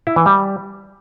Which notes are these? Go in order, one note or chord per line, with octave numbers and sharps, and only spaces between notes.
E4
E3
G3